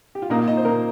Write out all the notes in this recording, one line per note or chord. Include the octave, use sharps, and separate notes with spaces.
G4
F4
A#2 A#3 D#4
F4
D#5
C5
A#2 A#3 A#4